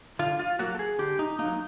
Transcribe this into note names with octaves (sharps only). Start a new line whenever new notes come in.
D3 F4
F4
F#3 A#3 F#4
A4
G#4
D3 G4
D#4
F#3 A#3 D#4